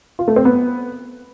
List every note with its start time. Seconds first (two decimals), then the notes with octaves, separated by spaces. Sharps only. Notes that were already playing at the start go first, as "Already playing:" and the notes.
0.19 F4
0.28 A3
0.36 C4
0.45 B3